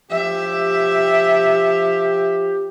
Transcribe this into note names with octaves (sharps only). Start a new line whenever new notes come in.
F3 G4 E5